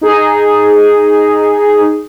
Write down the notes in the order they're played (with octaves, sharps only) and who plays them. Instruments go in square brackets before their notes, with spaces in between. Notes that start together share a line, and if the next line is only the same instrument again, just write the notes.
[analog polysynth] D#4 G#4